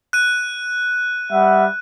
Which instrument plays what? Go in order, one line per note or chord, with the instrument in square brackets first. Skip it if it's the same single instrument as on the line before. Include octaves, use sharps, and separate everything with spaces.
[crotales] F#6 D#7
[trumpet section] G3 E5 F#5